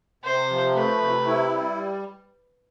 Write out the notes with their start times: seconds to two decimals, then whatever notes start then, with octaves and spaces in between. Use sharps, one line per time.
0.24 C3 C5
0.50 F3
0.75 A3 B4
1.01 C3
1.27 E4
1.52 G3